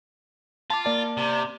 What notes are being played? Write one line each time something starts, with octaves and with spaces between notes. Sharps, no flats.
F4 A5 D6
A#3 D5 A5
C3